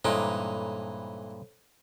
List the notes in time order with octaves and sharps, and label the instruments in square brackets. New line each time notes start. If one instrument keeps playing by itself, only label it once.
[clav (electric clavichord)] G2 A#2 G#3 [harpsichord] E3 D#4 [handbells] A4 C5 C#5